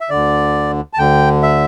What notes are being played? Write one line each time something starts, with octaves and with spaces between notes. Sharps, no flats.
E5
D2 D3 D5
A5
D2 D3 G5
E5